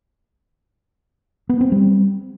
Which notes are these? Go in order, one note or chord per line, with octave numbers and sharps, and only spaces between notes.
B3
C4
G3